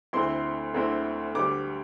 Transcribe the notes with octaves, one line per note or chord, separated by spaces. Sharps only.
D2 D3 C4 E4 C6
D2 D3 C4 E4
D2 D3 G3 D6